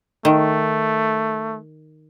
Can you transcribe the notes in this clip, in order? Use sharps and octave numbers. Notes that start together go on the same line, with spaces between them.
D#3 A3